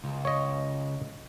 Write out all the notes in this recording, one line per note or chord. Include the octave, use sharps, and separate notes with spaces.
C#2
C#5 D#5